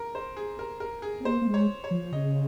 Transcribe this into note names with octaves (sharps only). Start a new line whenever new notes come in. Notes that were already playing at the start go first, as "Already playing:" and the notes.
Already playing: A#4
C5
G#4
A#4
A#4
G#4
C4
A#3 C5
A#3
G#3
C#5
C#5
F3
C#3 D#5